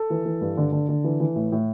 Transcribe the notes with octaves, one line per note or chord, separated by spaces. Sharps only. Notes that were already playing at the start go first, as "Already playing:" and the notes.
Already playing: A4
E3
E3
G2
D3
D3
D3
E3
E3
A2
A2